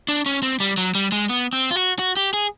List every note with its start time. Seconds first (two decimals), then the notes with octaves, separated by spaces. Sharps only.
0.08 D4
0.26 C#4
0.43 C4
0.60 G3
0.77 F#3
0.95 G3
1.12 G#3
1.29 B3
1.53 C4
1.71 F4
1.76 F#4
1.99 F#4
2.17 G4
2.34 G#4